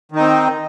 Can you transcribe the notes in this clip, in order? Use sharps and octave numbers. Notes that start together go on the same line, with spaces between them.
D#3 C4 D#4